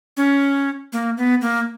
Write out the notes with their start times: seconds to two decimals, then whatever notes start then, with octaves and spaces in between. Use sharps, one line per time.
0.17 C#4
0.93 A#3
1.18 B3
1.42 A#3